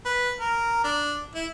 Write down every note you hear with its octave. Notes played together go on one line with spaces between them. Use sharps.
B4
A#4
D4
E4